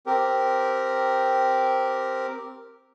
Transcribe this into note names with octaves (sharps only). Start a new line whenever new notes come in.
C4 G4 A#4